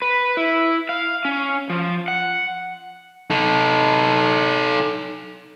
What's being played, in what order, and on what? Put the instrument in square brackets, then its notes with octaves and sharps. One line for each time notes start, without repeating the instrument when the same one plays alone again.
[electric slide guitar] B4
E4
F5
C#4
F3
F#5
[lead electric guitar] D#4 A4